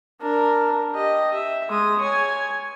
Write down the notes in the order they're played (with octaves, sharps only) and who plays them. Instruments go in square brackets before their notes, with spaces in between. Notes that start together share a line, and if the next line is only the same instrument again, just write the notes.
[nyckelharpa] D4 A#4
G4 D#5
E5
G#3 D#6
C#5 G#5